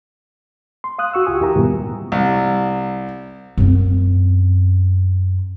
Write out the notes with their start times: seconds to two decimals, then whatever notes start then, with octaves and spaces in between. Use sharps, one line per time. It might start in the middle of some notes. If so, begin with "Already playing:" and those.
0.84 C6
0.99 F5 D#6 F#6
1.13 F#4 C#6 E6
1.26 C#2 F4 G4 G#5 D#6
1.41 E2 E4 G4 A#4 A#5
1.55 C#2 G#2 B2 D#3 G3 B3
2.12 C2
3.57 F#2 C4